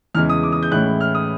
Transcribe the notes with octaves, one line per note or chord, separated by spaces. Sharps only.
E2 C#3 E3 G#3 F6
D#6
D6
D#6
G6
A2 E3 G#3 C#4 E4 F#6
F6
D#6